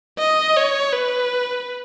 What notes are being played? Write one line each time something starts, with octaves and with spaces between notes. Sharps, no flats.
D#5
C#5
B4